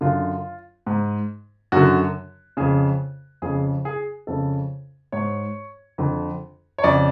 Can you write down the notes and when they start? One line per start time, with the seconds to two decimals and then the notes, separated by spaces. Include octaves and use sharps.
0.01 F#2 D3 F4
0.87 G#2
1.72 F#2 D3 F#4
2.57 F2 C#3 G#4
3.42 F2 C#3 G#4
3.85 G#4
4.27 F2 C#3 A4
5.12 G#2 C#5
5.98 F2 D3
6.78 C#5
6.84 F2 C#3 D5